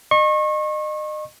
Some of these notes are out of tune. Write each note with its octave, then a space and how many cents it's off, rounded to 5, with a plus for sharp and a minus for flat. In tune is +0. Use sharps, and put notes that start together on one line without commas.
D#5 -35 C#6 -35